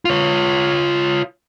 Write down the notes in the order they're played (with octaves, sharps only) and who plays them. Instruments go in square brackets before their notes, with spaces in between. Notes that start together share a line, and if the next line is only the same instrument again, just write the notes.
[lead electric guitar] F4 C#5